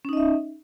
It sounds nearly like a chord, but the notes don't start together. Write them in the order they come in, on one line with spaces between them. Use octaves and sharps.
C#4 D#4 D#5 E5